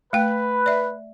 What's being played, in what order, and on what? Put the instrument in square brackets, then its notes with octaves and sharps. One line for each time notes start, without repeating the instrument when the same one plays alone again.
[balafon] A3 G5 [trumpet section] B4
[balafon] D5 E5